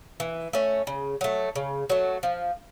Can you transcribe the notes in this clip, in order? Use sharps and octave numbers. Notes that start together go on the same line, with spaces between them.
E3
A3 C#4
C#3
F#3 A3
C#3
F#3 A3
F3